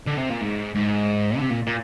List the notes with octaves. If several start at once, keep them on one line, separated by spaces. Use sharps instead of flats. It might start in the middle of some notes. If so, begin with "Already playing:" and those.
D3
C3
A#2
G#2
G#2
D3
C3
A#2
A#2